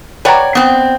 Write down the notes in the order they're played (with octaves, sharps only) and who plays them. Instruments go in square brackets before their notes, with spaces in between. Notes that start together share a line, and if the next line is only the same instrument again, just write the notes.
[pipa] B4 F#5 A#5 [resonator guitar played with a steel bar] C#5 D5 G5
[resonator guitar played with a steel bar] B3 C4